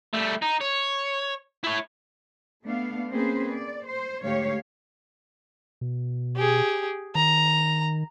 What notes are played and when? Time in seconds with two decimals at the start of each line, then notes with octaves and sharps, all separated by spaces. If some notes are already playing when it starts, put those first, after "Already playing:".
0.14 G3 A3
0.42 D#4
0.61 C#5
1.64 E4 C#5
2.64 A3 B3 D4 F5
3.11 A#3 C4 C#4 G#4 B4 C5
3.54 D5
3.87 C5
4.23 D2 G#2 G4 C#5 F5
5.81 B2
6.36 G4 G#4
7.15 D#3 A#5